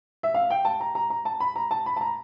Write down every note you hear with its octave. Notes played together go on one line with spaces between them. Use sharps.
E5
F5
G5
A5
A#5
A#5
A#5
A5
B5
A#5
A5
B5
A5
A#5